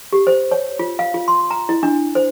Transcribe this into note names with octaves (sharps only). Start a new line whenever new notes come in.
G4
C5
C#5
F4
F5
F4
C6
A#5
E4
D4
C5